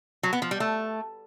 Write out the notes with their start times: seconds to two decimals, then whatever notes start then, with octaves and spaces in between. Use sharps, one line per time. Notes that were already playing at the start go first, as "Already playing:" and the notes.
0.23 F#3
0.33 B3
0.42 F3
0.51 G3
0.60 A3